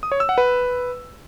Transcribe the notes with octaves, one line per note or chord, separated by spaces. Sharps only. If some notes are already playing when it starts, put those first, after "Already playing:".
D#6
C#5
E6
F#5
B4